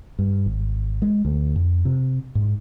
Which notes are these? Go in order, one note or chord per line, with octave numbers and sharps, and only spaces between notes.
G2
G#1
G#3
D2
F2
C3
G#2